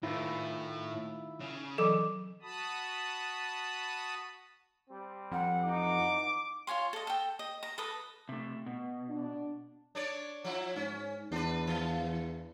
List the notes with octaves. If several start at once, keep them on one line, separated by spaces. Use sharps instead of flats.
A2 D#3 E4 F4
C#3
E3 F#3 A4 D6
F#4 A5 B5 D#6
G3 C4
F2 F#5
E3 D#4 D6
F4 C#5 G#5 C6
A4 D#5
A4 G5
D#5
A#5
A4 B4 D#6
C3 A3
B2
D4
D4 C#5 D5
F3 E4
G#2 C#4
E2 D4 B4
E3